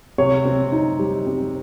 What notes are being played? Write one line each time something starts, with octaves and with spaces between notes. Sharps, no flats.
C3 C#5
C4
D#4
G3
C4